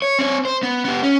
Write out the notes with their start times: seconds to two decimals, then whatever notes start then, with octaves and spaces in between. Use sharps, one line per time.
0.02 C#5
0.19 C4 C#5
0.45 C5
0.63 B3
0.85 B3 G4
1.03 C#4